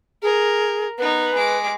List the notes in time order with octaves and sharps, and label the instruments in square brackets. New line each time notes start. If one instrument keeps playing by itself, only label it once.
[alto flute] G#4 [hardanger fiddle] A#4
[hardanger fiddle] B3 D#4 [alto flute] B4
[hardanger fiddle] G#3 D6